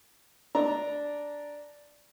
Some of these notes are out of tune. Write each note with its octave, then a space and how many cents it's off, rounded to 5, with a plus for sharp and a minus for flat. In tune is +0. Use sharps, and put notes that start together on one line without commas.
D4 -5 A#5 +0